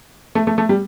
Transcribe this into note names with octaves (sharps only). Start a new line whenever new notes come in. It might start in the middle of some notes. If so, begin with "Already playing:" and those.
A3
A3
A3
G3